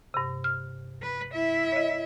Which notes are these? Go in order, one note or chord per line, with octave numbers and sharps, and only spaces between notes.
G2 C3
F6
B4
E4 E5
C#5 D#5